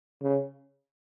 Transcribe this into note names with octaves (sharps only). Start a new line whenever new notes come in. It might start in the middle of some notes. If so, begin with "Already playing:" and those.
C#3